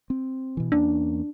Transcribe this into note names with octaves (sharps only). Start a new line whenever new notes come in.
C4
B2 E3
E2 A#3 C#4 D4